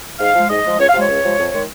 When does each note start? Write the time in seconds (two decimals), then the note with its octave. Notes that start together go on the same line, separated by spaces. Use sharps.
0.20 G#2 F5
0.35 F3 G#3
0.50 G#2 D#5
0.65 F3 G#3
0.79 C#2 C#5
0.89 F5
0.94 C3 F3 G#3 C#5
1.09 C#2
1.23 C3 F3 G#3
1.39 F2
1.53 D#3 G#3